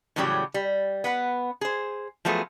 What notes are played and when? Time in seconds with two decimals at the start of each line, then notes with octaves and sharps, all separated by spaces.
0.16 A2 C#3 E3 F#3 G3 G4
0.54 G3
1.04 B3 B4 F#5
1.61 G#4 C5
2.25 F3 F#3 A3 B3 G#4